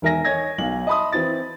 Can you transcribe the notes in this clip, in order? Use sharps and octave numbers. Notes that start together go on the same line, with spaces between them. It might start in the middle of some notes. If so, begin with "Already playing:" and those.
E1 D#3 A#4 E5 G#5 A#6
C#5 D#5 G#5 G#6 A#6
B1 F5 F#7
D#5 E5 A5 B5 C6 D#6
E3 C4 E4 A6